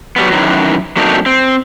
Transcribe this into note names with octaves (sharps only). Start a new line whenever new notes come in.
F#3 G3 B3
F#2 D#3 E3 F#3
F#3 A3 A#3 C4 D4 D#4
C4